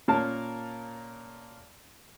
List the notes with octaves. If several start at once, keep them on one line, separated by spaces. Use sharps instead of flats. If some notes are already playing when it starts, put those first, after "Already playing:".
A#2 A#3 C#4 A#4 A5